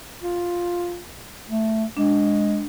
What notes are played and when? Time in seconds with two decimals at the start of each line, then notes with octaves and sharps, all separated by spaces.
0.22 F4
1.49 A3
1.97 G#3 D4